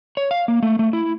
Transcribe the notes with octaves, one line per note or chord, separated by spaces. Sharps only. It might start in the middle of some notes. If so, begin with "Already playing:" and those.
C#5
F5
A#3
A3
A3
E4